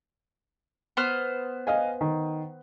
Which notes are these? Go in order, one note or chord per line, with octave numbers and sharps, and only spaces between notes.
B3 C5 F6
D#5 F5 G#5
D#3